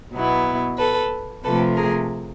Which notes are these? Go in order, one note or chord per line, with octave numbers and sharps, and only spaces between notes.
B2 F#3 B3 E4
A4 B4
C3 F3 A3 A4 B4
G#4 A#4